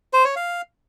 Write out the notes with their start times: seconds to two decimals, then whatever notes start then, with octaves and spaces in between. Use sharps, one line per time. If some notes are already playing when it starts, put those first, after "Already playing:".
0.13 C5
0.25 C#5
0.36 F5